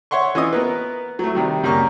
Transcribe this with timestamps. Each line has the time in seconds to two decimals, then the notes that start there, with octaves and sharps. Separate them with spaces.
0.11 C#5 E5 F#5 C6 C#6
0.35 E3 C#4 F4 D#5 D#6
0.53 B3 A#4 B4
1.19 F#3 A3
1.35 C3 D#3 G3
1.63 C#2 F#2 G3 A#3 C#6